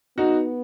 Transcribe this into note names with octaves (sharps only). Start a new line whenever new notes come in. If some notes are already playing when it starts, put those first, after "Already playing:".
B3 D#4 F#4